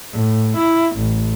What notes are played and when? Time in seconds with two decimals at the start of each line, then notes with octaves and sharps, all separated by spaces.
0.13 A2
0.58 E4
0.97 A1